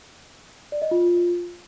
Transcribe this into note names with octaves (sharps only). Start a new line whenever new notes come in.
D5
D#5
F4